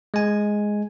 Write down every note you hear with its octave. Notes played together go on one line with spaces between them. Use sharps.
G#3 G#5